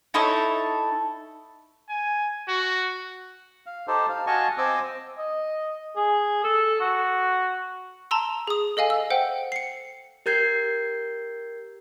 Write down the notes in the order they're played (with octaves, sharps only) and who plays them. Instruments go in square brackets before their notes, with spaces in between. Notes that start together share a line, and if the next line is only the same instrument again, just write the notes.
[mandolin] D#4 E4 A4 C#5
[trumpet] G#5
F#4
[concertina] F5
D#4 G4 A4 C5
F5
F#4 D#5 F5 G#5 A5 C#6
C4 C5 D#5 G#5 D6 E6
[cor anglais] D#5
G#4
A4
F#4
[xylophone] A5 A#5 C6 E6
G#4 D#6
A4 D#5 F5 G#5
E6
C5 F#5 G5
C7 C#7
[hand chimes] G4 A#4 G6 G#6 C7